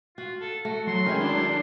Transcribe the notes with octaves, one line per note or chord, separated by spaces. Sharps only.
F4 F#4
A4
A3 F#4
F#3 C6
D#3 G#3 C#4 E4
F#3 D4